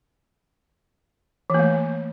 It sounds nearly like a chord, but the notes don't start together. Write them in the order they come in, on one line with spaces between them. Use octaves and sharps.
E3 A#3 A3